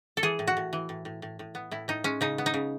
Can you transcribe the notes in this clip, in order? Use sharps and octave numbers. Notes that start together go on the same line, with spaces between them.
A4
E3 G#4
A2
F#4
A2
E3
A2
A2
A2
A2
B3
A2 E4
A2 D#4
G#3 C#4
C#3 D#4
B3
D#4
C#3